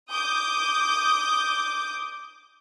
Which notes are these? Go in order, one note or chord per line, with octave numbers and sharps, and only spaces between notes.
D6 D#6 G6